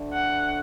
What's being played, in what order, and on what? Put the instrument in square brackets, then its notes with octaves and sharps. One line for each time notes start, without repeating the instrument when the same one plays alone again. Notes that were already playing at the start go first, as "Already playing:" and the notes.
Already playing: [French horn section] D2 D3 A3 D4
[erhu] F#5